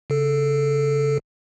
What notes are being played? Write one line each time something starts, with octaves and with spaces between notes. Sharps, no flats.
C#3 A4